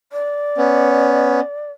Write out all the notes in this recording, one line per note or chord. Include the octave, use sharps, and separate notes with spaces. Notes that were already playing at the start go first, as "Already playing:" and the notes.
D5
B3 C#4